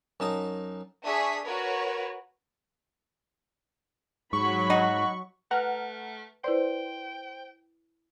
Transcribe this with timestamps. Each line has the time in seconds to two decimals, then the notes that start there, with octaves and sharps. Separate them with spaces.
0.20 F#2 D#4 A5 D#6
1.03 D4 G#4 E5 C#6 D#6 B6
1.43 F#4 A#4 B4 C#5
4.33 G#2 F#3 B5 C#6
4.70 D#4 F#4
5.51 A3 B4 F#5 A#5 F6
6.44 E4 B4 C5 D5 G5